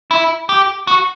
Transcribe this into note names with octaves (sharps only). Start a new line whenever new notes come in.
E4
G4
F#4